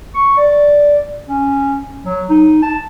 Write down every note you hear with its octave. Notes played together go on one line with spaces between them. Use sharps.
C#6
D5
C#4
F#3
D#4
A5